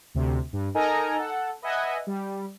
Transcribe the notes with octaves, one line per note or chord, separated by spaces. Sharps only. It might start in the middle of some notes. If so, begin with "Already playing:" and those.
D2 C3
G2
D#4 A4 A#4 D#5 G#5 A#5
A4 F#5
B4 D#5 E5 F#5 G#5
G3